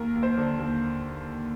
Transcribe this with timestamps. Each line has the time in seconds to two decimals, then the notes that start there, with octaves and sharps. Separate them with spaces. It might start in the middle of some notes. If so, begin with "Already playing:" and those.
Already playing: D#2 A#4
0.15 D#2
0.23 C5
0.38 D3
0.59 D#2